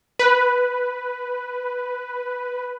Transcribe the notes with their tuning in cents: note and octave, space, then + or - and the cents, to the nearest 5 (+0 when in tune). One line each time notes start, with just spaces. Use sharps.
B4 +0